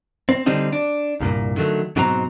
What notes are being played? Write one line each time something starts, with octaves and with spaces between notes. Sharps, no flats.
C4
D3 G3 C4 D4 D#4
D4
C2 G2 A#2
D3 D#3 F#3 A3
G#2 B2 F#3 C4 A#5